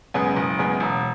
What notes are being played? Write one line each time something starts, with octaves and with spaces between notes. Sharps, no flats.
F#2 C#3 G#3 B3
F#1
F#2 C#3 G#3 B3
E1